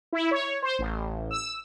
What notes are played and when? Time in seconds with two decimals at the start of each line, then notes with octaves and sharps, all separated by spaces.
0.13 E4
0.31 C#5
0.62 C5
0.79 A1
1.31 E6